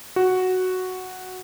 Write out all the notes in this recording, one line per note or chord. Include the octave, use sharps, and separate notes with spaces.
F#4